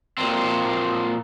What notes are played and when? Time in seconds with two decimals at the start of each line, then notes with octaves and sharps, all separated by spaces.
0.17 A#2 C4